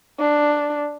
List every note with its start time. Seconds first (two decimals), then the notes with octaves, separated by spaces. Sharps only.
0.19 D4